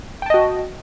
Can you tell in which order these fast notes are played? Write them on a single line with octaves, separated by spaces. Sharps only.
G5 A5 D#5 F#4